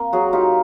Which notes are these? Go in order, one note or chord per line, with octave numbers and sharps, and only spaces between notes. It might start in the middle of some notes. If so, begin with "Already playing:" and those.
Already playing: A#3 C4
F#3 F#4 G#4
D#4 F4 G4